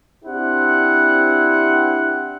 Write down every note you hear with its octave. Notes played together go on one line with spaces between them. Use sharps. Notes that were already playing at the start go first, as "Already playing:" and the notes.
C4 D4 E4 G4 C5 F#5